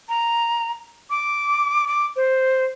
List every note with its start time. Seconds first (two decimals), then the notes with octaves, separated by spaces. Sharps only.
0.09 A#5
1.10 D6
1.87 D6
2.16 C5